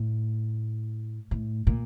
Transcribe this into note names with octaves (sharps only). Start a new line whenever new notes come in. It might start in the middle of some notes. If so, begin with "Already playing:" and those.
Already playing: A2
A2
A#2